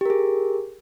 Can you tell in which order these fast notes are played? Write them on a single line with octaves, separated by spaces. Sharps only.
G4 A#4 G#4